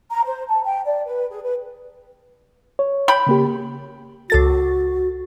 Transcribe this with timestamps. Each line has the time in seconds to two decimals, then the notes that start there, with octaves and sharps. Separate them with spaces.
0.11 A#5
0.26 C5
0.48 A5
0.64 G5
0.86 D5
1.06 B4
1.30 G#4
1.43 B4
2.79 C#5
3.08 G5 B5
3.27 C#3 A#3 G4
4.30 C#2 F#4 A4 A6